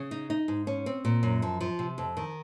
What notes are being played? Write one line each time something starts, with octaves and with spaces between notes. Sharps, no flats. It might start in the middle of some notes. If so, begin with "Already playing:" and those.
Already playing: C#3
D#4
D#4
G#2
C#4
C4
A#2
F#2
F3
F3
C3
F2
D#3